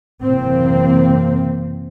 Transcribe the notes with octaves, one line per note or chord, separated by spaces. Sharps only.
F#1 C3 E3 A#3 C4